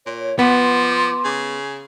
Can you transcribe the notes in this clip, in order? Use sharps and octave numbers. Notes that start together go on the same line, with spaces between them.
A#2 C#5
F3 B3 C6 D6
C#3